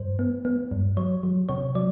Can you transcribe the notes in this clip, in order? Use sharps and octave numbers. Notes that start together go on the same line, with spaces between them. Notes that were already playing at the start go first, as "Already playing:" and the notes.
Already playing: G2 C5
B3
B3
G2
F#3 C#5
F#3
C3 C#5
F#3 D5